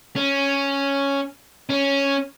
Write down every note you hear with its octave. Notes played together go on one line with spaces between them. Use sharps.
C#4
C#4